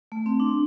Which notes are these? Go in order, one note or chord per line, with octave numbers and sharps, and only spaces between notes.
A3
C4
D4